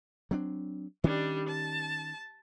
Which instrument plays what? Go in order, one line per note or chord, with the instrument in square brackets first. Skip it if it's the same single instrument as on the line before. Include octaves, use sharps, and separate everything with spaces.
[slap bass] F#3 C4 D4
[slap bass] D#3 C#4 [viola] G3 D4
[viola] A5